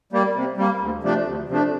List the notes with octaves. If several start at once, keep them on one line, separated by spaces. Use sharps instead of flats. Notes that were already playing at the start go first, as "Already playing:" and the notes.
G3 A#3
C3
G3 A#3
D2
C3 F3 A3 D4
D2
C3 F3 A3 D4